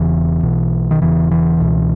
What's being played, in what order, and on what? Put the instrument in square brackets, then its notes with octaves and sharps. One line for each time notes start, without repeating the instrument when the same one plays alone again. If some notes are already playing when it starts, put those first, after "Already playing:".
Already playing: [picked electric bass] E1 E2 C#3 E3
B1 B2
D#3
E1 E2 C#3 E3
E3
C#2 B2